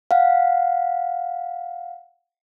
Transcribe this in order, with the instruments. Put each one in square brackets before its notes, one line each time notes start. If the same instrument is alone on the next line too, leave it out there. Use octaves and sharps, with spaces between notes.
[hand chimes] F5 F#5